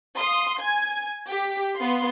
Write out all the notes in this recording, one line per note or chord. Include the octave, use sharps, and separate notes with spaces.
F5 C6 D#6
G#5 G#6
G4 B6
B3 F5 C6